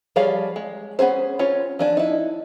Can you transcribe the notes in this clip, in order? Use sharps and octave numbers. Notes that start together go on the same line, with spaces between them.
F3 G3 G#4 C#5 F5
G#3
B3 C#4 G#4 C5
C#4 F4 C#5
F3 D4 G#5
D#4 E4